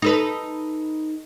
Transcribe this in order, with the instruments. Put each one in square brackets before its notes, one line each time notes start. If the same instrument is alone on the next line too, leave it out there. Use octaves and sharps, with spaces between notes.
[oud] D#4 A4 B4